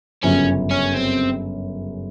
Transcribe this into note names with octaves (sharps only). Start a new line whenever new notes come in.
G1 F#2 C#3 C#4
C#4
C4